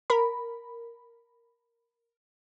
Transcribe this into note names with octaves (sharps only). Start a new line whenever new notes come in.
A#4 B5